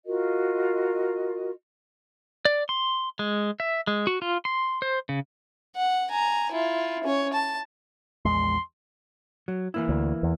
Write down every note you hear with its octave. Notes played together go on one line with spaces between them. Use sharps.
F4 F#4 A#4 D#5
D5
C6
G#3
E5
G#3
F#4
F4
C6
C5
C#3
F#5
G#5 A#5
E4 F4
C#4 C#5
A5
A#1 E2 G#3 C6
F#3
E3 A#3 E4
D2
E2